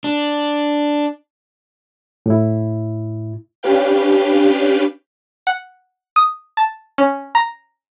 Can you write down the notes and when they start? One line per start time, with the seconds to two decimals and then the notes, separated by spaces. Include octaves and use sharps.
0.04 D4
2.26 A2 E4
3.63 C#4 D4 G4 B4 F5 G5
5.47 F#5
6.16 D#6
6.57 A5
6.98 C#4
7.35 A#5